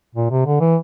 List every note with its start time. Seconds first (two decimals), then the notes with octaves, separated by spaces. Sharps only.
0.15 A#2
0.31 C3
0.46 D3
0.61 E3